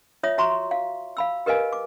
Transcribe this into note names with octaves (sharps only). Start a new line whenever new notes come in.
F4 C#5 E5 D#6
F#4 E5 A#5 C6 C#6
F5
F5 B5 E6
G4 A#4 B4 D#5 F5 G#5
D6